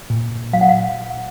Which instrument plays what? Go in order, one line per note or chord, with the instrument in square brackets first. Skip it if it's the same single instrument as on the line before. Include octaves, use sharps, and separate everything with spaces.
[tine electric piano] A#2
A#2
[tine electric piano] F#3 [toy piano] F5
[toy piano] F#5
F5